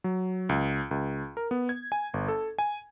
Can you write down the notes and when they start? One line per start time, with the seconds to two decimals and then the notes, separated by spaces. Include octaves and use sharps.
0.04 F#3
0.49 C#2
0.91 C#2
1.37 A#4
1.51 B3
1.69 G#6
1.92 G#5
2.14 G1
2.28 A4
2.59 G#5